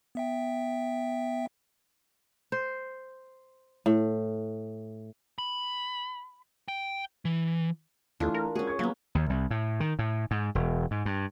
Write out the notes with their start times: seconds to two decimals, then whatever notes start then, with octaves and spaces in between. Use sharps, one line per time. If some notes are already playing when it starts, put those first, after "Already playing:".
0.15 B3 E5 G5
2.52 C5
3.86 A2
5.38 B5
6.68 G5
7.25 E3
8.20 D#2 E3 A3 D4 F4
8.34 A#4
8.55 G#3 C#4 F#4 G#4
8.67 C#5 C#6 G#6
8.79 F#3 A#3 B3
9.15 D#2
9.30 C2
9.51 A2
9.80 D#3
9.99 A2
10.31 G#2
10.55 E1
10.91 G#2
11.05 G2